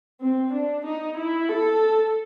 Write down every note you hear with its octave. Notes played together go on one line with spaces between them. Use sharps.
C4
D4
D#4
E4
A4